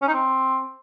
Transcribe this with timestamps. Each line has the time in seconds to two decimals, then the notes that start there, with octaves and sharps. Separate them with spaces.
0.02 C#4
0.08 D#4
0.13 C4